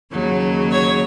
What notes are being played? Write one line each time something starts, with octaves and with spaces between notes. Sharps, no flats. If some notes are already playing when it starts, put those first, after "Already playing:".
D#2 C#3 F#3
C#5